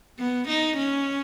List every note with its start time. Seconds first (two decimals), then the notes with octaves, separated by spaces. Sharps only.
0.19 B3
0.49 D#4
0.77 C#4